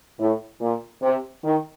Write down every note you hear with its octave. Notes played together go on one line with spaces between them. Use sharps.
A2
A#2
C3
D#3